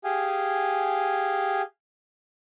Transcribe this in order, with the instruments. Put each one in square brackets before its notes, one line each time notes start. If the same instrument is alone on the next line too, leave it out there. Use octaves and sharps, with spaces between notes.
[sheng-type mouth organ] G4 G#4 F5 G#5